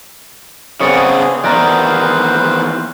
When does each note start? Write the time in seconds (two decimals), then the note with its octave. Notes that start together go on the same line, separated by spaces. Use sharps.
0.80 C#3 B3 C4 G#4 C#5 D5 C#6
1.44 E2 D#3 B4 C5 D5 F5 A#5